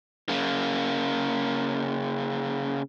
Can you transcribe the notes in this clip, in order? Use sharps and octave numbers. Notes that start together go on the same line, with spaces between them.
C#3 A#3